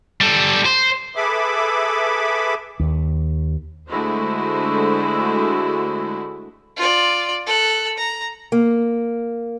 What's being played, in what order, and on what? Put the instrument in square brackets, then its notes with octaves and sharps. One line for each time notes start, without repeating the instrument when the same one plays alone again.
[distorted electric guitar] G3 A4
C5
[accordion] G#4 A4 B4 E5 B5 D6
[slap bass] D#2
[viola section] D3 G#3 A3 E4 F#4 C5
[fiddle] F4 D5
A4 F#6
A#5
[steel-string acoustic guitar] A#3